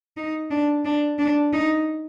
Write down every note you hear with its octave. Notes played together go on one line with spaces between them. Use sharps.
D#4
D4
D4
D4
D#4